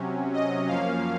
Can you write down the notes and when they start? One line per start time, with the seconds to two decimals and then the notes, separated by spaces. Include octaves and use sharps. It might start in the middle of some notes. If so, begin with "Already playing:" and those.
Already playing: C3 F#3 C#4
0.33 D#5
0.68 F#2 F3 A#3 C#4 F5